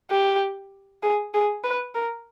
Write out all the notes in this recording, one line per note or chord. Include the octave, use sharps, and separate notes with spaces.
G4
G#4
G#4
B4
A#4